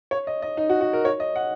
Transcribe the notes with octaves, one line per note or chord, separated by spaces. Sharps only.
C#5
D#5
D#5
D#4
F#4
F#4
A#4
C#5
D#5
F#5